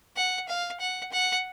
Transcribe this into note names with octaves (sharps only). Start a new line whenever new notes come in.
F#5
F5
F#5
F#5